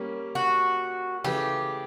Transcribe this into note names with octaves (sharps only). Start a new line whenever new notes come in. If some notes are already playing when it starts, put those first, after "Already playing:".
Already playing: G3 A#3 C#4
F#4
C#3 E3 A3 G4